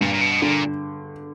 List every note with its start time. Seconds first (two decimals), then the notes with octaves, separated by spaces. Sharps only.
0.01 G2 A#2
0.13 A#2
0.21 B2
0.42 A#2 D3